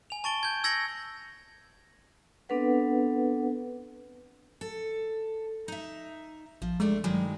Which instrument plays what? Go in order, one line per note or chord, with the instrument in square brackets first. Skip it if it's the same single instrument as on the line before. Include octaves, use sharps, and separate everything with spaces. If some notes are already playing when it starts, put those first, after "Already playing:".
[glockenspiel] G#5 F7
A5 C#6 A6 D7 G7
G6 G#6
E6 G#6 A#6 C#7 F#7
[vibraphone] B3 C4 D4 A4 B4 F#5
[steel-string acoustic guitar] A4
D#4 E5
[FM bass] A1 [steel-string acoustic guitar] F3
[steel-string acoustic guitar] C3 A3 D4 [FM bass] G#3
[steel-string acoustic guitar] G2 D#3 G#3 [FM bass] F#3